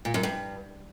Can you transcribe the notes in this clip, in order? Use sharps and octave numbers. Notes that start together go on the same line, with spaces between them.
A#2
F#2
G2